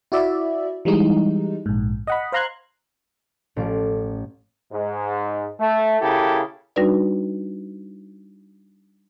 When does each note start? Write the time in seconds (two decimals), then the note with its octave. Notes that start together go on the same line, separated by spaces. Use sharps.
0.12 E4 F#4 D5 E5
0.85 E3 G3 G#3 D#4
1.66 A#1 G#2
2.07 D#5 F#5 B5
2.32 C5 F5 A#5 C6 F#6 G#6
3.56 A1 F3 D6
4.72 G#2
5.60 A3
6.00 C#3 A#3 E4 G4 A4
6.76 G3 D4 D#4 F#4 B4 D5